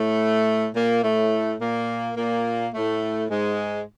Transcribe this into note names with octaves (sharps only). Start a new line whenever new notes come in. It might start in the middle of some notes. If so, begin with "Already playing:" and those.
Already playing: A2 A3
A#2 A#3
A2 A3
A#2 A#3
A#2 A#3
A2 A3
G#2 G#3